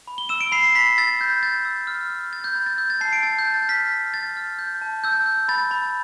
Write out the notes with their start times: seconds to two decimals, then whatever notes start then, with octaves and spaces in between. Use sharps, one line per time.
0.07 B5
0.18 G7
0.29 E6 E7
0.41 D7
0.52 B5 C7
0.75 B5 B6
0.98 E6 A6
1.21 G6
1.43 G6 A6
1.65 E6
1.87 F6
2.10 F6
2.33 F6 A6
2.44 G6
2.55 B5 A6
2.66 A6
2.78 E6 G6
2.90 A6
3.01 A5 C7
3.13 D7
3.23 E6 A6
3.39 G6
3.45 A5
3.54 A6
3.69 F6 B6
3.91 F6
4.13 F6 A6
4.37 F6
4.59 G6
4.82 A5
5.04 E6 G6
5.26 G6
5.48 B5 A6
5.71 B5